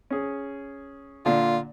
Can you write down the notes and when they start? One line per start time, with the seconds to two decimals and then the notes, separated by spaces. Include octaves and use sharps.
0.11 C#4 G#4
1.26 A#2 D3 F4